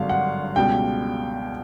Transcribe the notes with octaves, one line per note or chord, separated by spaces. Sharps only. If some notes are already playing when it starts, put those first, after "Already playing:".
Already playing: G#1 G2 D3 F#3 F5
F#5
C#2 B2 G3 G5